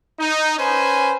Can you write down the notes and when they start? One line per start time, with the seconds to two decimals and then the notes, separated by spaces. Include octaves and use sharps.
0.18 D#4
0.57 C#4 B4 C5 G#5